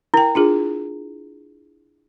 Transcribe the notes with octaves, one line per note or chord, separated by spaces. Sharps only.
E4 A#4 G5
D4 F4 G#4